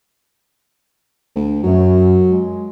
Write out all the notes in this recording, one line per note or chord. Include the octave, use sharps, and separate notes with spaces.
D2
F#2 F#3
G#3